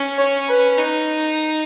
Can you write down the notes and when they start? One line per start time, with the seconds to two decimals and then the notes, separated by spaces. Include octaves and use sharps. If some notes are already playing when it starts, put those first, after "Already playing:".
Already playing: C#4
0.18 C#5
0.48 B4
0.77 D#4